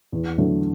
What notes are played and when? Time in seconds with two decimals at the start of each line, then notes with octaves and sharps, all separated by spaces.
0.12 E2
0.38 D3 F#3 A3